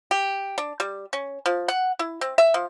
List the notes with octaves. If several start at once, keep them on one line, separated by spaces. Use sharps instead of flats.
G4
D4
G3
C#4
F3
F#5
E4
C4
E5
F3